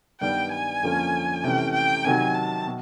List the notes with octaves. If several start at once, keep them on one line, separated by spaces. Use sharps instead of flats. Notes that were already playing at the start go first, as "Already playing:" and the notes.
G2 D#3 G3 B3 G5
G#5
F2 D3 F3 A#3 C#4
C3 E3 A3 C#4 G5
G5
C3 D#3 F#3 G#5
A5
B2